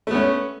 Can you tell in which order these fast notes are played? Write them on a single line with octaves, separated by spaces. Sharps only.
A3 B3 C#4